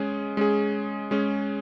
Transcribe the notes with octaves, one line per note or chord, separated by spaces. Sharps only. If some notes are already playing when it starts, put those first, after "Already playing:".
Already playing: G#3 C#4 G#4
G#3 C#4 G#4
G#3 C#4 G#4